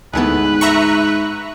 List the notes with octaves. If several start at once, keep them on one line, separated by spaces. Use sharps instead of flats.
D2 G#2 E3 B3 B4
E5 A#5 C#6